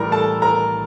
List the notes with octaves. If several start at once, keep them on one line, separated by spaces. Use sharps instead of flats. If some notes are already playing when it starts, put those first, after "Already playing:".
Already playing: A2 E3 G3 A#4 A#5
A4 A5
A#4 A#5